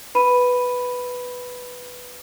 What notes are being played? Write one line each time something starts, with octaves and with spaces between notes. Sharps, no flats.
B4 B5 D#7